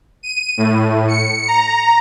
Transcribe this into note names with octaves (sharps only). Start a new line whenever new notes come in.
D#7
A2
C#7
A#5